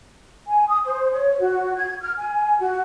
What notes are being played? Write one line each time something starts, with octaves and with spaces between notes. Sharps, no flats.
G#5
D#6
C5
C#5
F#4
G#6
F6
G#5
F#4